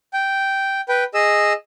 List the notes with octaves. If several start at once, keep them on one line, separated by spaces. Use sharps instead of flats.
G5
B4 G5
G#4 D#5 E6